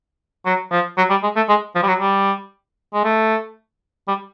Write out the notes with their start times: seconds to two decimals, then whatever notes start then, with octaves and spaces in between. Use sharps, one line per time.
0.46 F#3
0.72 F3
0.98 F#3
1.10 G3
1.23 G#3
1.36 A3
1.49 G#3
1.75 F3
1.83 G3
1.88 F#3
2.01 G3
2.94 G#3
3.04 A3
4.08 G3